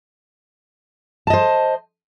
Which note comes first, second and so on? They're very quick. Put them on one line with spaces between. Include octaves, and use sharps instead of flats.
A5 D#5 C5